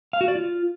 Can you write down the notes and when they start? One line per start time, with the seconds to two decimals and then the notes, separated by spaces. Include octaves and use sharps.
0.13 F5
0.21 F#4
0.28 D5
0.35 F4